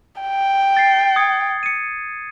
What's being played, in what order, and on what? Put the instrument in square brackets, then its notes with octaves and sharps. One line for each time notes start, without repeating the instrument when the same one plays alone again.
[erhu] G5
[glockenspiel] A6 C7
D#6 G#6 C#7
C#7 D#7